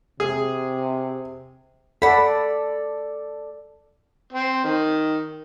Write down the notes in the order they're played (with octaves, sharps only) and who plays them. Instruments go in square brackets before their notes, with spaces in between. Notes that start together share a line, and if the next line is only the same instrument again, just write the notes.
[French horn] C3 [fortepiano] G#4
[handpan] A4 D5 [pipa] F#5 B5
[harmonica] C4
D#3